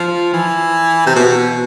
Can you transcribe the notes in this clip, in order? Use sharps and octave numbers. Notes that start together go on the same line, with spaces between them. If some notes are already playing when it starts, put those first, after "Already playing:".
Already playing: F3
E3
C3
B2